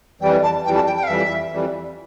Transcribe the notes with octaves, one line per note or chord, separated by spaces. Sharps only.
F2 E3 G3 G5
A5
F2 E3 G3 G5
A5
G5
G5
F5
F2 E3 G3 E5
F2 E3 G3